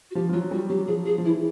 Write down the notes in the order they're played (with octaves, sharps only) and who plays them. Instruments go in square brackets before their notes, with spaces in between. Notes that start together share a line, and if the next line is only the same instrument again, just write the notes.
[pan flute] F#4
[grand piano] F3 [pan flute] G4
[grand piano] F3
[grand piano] F#3 [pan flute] F4
[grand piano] G3 [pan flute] F#4
[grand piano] F#3 [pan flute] G4
[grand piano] F3 [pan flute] G#4
[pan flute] G#4
[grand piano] F3
[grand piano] E3 [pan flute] E4